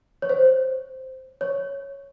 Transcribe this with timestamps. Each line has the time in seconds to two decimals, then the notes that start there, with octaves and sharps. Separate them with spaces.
0.22 C#5
0.30 C5
1.41 C#5